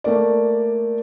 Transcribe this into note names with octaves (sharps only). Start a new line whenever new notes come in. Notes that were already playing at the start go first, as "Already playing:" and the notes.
A3 A#3 D5